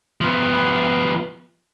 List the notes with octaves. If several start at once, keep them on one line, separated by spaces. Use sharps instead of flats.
F3 B3